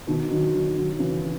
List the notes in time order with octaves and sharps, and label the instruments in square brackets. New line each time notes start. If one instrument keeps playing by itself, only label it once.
[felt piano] B2 D#3
D#3 F#3
D#3 F#3
D#3 F#3
F#3
C#3 E3